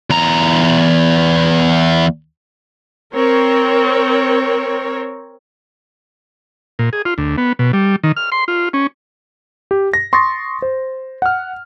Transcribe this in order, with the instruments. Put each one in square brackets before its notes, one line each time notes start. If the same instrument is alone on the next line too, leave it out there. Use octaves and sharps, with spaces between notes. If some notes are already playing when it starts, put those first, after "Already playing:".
[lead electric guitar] E2 A#5
[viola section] C4 A#4 C#5
[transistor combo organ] A#2
G#4
F4
D2
B3
B2
G3
D#3
F6
C6
F4
C#4
[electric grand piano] G4
A#6
C6 C#6 D#6 A6 A#6
C5
F#5 F6